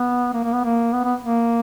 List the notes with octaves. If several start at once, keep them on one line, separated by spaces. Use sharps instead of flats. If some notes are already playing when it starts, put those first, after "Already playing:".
Already playing: B3
A#3
A#3
B3
A#3
B3
B3
A#3